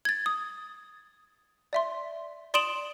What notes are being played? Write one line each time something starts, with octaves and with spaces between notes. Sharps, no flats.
G#6 A6
D#6
D5 E5 C6
D5 C6 D#6 D7 E7 F#7